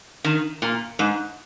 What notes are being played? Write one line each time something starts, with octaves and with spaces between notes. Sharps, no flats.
D#3
A#2
G#2